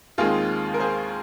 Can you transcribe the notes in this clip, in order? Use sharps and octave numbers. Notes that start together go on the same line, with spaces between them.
D#2 D#3 G#3 C4 F4 G#4
A#4
G#4 C5